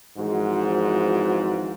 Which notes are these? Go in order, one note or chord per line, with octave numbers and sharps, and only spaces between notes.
G#1 G#2 E3 F3 G#3 F#4